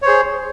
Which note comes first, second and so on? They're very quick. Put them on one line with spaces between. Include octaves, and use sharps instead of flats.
C#5 C5 G#4